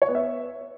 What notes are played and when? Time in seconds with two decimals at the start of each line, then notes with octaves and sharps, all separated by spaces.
0.02 C#5
0.08 B3
0.15 E5